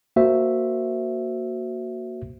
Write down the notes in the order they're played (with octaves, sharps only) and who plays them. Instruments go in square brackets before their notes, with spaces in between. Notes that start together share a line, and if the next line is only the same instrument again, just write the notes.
[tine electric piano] A#3 F#4 C5 E5